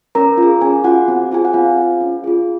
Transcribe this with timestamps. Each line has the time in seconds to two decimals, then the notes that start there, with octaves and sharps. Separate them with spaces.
0.15 C#4 A#4 A#5
0.38 F4
0.43 G#4
0.61 C#4 G#4 G#5
0.84 F4 F#4 G#4 F#5
1.08 C4
1.32 F4 G#4 G#5
1.45 F#5
1.54 C4 F4 F5
1.77 F4 G#4
2.01 C#4
2.24 F4 G#4